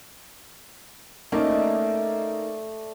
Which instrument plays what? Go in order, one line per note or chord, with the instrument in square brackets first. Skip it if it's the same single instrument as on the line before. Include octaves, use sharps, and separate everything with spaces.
[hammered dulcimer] A3 D5 D#5 [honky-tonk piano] A#3 C#4 D#4